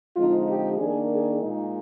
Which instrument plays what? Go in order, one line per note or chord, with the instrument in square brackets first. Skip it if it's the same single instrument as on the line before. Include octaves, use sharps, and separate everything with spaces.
[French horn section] D3 F3 G#3 C4 D#4 F4
G4
D#3 A#3 D4 G#4
G#4
A#2 G#3 D#4